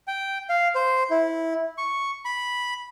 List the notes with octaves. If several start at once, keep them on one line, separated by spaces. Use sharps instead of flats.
G5
F5
C5
E4
C#6
B5